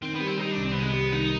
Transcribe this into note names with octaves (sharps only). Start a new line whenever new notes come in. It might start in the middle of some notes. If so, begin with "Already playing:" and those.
D#3 C4
B3
G3
C4
G3 D#4
D4
C2
C4
B3
C3 G#3
B3
G3
D#3 D#4